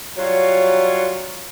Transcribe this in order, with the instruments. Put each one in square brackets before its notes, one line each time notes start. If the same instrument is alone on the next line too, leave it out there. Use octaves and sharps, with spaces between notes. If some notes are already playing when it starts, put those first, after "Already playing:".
[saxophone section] F#3 G3 F4 C#5